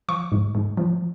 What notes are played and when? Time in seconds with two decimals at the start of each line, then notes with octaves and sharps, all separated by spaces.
0.09 F3 C#6
0.32 G#2
0.55 G#2
0.77 F3